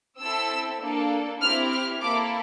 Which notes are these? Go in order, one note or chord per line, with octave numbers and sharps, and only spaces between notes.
C4 E4 A4 E6
A#3 D4 A4
C4 E4 G4 F6
F6
A#3 E4 A4 D6